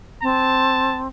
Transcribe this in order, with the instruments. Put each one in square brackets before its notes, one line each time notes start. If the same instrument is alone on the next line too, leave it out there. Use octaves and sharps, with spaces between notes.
[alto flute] C4 [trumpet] A5